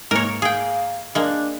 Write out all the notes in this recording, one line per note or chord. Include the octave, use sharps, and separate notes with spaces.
G#2 A#3 A#4 C#5
G#4 F5 G5
G#3 A#3 D4